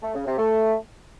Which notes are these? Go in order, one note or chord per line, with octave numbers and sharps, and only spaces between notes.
A3
C#3
C3
A3